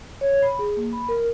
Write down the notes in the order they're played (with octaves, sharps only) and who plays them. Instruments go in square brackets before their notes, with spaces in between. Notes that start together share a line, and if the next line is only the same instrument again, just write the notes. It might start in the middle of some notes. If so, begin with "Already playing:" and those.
[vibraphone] C#5
B5
G#4
A#3
B5
A#4